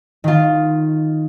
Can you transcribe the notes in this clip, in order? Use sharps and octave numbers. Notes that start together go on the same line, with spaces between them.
D#3 F4